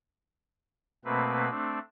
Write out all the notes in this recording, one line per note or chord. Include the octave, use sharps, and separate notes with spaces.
B2 A3 A#3 C4 B4
A3 C4 D4